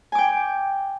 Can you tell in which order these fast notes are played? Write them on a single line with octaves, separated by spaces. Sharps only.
G#5 D6 G5